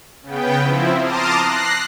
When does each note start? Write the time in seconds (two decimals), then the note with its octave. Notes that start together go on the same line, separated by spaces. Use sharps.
0.23 C#3 B3 G5
0.60 F3 C4 E4
0.99 A5 A#5 C6 D6 D#6 F6
1.36 F#6 A#6 C7